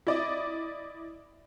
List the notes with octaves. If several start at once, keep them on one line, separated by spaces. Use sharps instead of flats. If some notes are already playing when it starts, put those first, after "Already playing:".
E4 D5 D#5